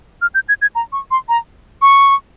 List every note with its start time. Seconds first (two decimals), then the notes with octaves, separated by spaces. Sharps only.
0.22 F6
0.35 G6
0.49 G#6
0.62 G#6
0.75 A#5
0.92 C#6
1.11 C6
1.29 A#5
1.82 C#6